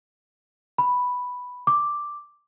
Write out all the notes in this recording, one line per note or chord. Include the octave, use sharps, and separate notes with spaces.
B5
D6